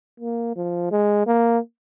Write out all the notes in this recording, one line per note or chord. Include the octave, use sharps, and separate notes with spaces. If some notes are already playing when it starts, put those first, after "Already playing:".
A#3
F3
G#3
A#3